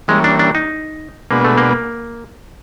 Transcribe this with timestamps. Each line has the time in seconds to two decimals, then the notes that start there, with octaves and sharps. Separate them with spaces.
0.08 E3 G3 G#3 A#3 C#4
0.24 D4
0.39 D4
0.55 D#4
1.31 B2 G#3 A#3 B3 D4 F#4
1.44 A3
1.58 A#3